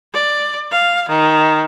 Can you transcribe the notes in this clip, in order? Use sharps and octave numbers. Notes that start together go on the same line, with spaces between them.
D5
F5
D#3